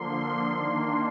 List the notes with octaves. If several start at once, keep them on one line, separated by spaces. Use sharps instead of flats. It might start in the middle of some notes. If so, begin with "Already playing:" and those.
Already playing: D3 F3 A#3 C6
D#3 A#3 D4